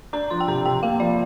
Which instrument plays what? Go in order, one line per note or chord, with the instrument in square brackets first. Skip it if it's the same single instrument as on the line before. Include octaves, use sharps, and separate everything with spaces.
[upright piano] D4 [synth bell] A#5
[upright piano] F3 [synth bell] C6
[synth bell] G5
[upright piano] C3 [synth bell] A#5
[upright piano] C3 [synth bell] G5
[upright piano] A#3 [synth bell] F5
[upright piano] F3 [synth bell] D5